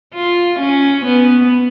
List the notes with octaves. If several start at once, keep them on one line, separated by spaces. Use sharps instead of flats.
F4
C#4
B3